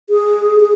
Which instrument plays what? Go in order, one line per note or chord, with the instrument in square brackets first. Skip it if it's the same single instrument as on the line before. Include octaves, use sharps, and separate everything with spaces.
[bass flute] G#4
G#4